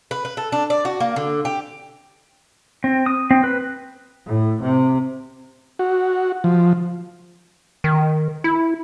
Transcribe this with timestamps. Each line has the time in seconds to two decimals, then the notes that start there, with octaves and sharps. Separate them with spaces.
0.11 B4
0.25 B4
0.37 A4
0.52 D4
0.70 D5
0.85 F#4
1.00 A#3
1.16 D3
1.45 G4
2.84 C4
3.06 D#6
3.31 C4
3.44 B4
4.27 A2
4.62 C3
5.79 F#4
6.44 F3
7.84 D#3
8.44 E4